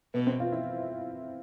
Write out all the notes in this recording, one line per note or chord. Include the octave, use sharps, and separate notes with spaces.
B2 B3
C4
F4
E4